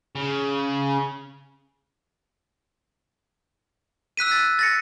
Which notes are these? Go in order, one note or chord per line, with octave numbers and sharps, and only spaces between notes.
C#3
E6 F#6 B6 D#7
A6
A6 A#6 C#7